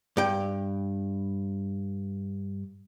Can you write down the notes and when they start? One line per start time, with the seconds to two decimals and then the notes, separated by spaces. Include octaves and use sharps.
0.17 G2 G5